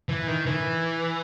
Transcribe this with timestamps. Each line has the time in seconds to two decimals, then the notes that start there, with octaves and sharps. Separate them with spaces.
0.09 E3
0.27 D#3
0.46 E3